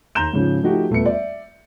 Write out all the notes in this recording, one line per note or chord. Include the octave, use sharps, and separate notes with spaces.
D#2 A#5 C6 G6 E7
G#2 C#3 F3
F3 A3 D#4 F#4 G4
D#1 A3 B3 C#7
D5 E5